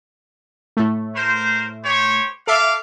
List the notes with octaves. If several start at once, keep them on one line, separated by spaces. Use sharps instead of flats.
A2 A3
A#4 C5
G4 C5 C#5
A4 E5 F5 D6